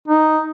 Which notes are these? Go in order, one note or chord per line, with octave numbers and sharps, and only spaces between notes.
D#4